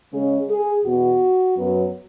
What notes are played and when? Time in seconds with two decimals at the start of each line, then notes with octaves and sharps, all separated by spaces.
0.12 C#3 G#3 C#4 G#4
0.49 G#4
0.84 E2 B2 B3 F#4
1.57 F#2 F#3 B3